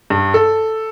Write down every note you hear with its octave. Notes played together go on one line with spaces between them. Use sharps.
G2
A4